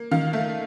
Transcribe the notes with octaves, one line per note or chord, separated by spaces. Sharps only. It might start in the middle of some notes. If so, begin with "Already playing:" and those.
Already playing: A#3
D#3 F5
A3